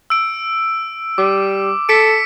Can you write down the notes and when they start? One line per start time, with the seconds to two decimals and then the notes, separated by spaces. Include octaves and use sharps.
0.10 E6 D7
1.18 G3 D6
1.89 A4 B6 C#7 D7